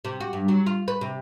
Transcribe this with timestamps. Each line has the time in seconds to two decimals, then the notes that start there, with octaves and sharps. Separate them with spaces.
0.05 C3
0.20 F#4
0.33 G2
0.48 F#3
0.66 F4
0.88 B4
1.01 C3